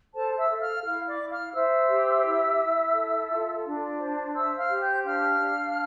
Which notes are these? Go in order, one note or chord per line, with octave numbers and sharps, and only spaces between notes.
A4 C5 A5
E5 E6
A4
F5 F6
E4 F5 F6
D5 D6
E4
F5 F6
C5 E5 E6
G4
E4
E4
A4
F4
D4
C5
C5 E5 E6
F5 F6
G4
G5 G6
D4 F5 F6
D4